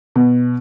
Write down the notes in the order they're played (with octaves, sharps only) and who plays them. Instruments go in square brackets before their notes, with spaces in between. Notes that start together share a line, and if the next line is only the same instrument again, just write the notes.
[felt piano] B2